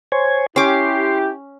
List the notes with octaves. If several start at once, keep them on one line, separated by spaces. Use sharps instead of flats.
C5 C#5 G#5
C#4 E4 G4 C6 D6